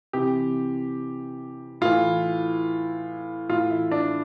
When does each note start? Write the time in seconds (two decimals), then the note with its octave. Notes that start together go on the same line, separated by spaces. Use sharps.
0.13 C3 E3 G4
1.81 A2 E3 F4
3.49 A2 E3 F4
3.70 E4
3.91 D4